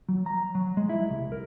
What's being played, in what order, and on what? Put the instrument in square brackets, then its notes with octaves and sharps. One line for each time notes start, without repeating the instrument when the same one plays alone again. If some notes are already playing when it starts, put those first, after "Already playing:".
[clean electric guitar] F#3
A#5
F#3
G#3
E4
C2
A#4